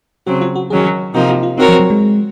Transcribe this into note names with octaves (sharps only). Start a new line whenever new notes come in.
C#3 F#3 C4 F#4
F4
F#4
D#3 F#3 C#4 G#4
C3 F3 A#3 D#4 F#4
F#4
F4
C4 D#4 F#4 A#4 C#5
F3
F#3
G#3